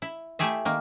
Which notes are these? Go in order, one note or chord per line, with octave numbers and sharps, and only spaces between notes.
E4
A3 E4 G4 G#4 E5
D#3 A#3